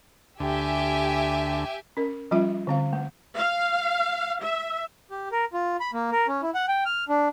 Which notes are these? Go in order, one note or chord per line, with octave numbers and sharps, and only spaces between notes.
D2 G4 E5 G#5
C#4 A#4
F3 G3 C#4 F4 E5
D3 C4 F5
A3
F5
E5
G4
A#4
F4
B5
A#3
A#4
C#4
E4
F#5
G5
F6
D4